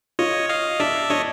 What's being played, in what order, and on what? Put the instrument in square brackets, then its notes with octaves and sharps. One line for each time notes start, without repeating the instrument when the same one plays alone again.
[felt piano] F4 [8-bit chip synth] C#5 D#5
[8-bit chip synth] D#5 F5
[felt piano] D4 [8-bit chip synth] D5 E5
[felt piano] D4 [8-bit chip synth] C#5 D#5